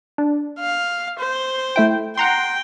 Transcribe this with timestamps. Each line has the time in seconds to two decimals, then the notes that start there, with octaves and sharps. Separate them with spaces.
0.18 D4
0.59 F5
1.19 C5
1.76 A3 E4 G5
2.18 F#5 G5 A#5 C6